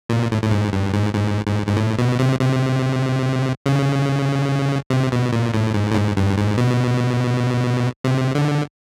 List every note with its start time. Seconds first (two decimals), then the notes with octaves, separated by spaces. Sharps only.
0.09 A#2
0.32 A2
0.43 A2
0.51 G#2
0.73 G2
0.93 G#2
1.14 G#2
1.46 G#2
1.67 G#2
1.77 A2
1.99 B2
2.19 C3
2.39 C3
3.66 C#3
4.90 C3
5.12 B2
5.32 A#2
5.54 A2
5.74 G#2
5.92 A2
5.95 G#2
6.17 G2
6.38 G#2
6.57 B2
8.04 C3
8.35 D3